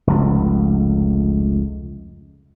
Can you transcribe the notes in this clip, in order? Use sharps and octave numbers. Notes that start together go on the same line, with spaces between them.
F1 C#2